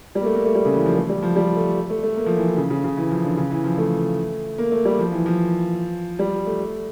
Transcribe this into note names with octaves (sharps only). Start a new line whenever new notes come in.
G3
A#3
A3
A#3
A3
G3
C#3
E3
F3
A3
G3
F3
G3
A3
A3
A3
A#3
F3
E3
E3
C#3
C#3
C#3
E3
F3
D3
C#3
E3
F3
A3
A#3
A3
G3
F3
E3
F3
G3
A3